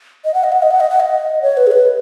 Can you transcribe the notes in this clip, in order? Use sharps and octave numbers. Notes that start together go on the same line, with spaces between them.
D#5
F#5
D#5
F#5
D#5
F#5
D#5
F#5
D#5
C#5
B4
G#4
B4